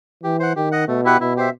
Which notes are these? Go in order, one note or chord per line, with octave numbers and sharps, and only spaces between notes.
E3 G4
C5 F#5
D#3 G4
D#5 F#5
B2 A3
E4 G4 B4 F#5
B2 E4
G4 C5 E5